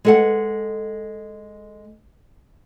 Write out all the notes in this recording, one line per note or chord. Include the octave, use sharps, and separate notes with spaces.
G#3 A4 F#5